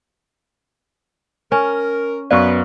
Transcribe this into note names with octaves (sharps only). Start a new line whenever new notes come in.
C#4 A#4
F#2 B3 B4 D5 F5 C#6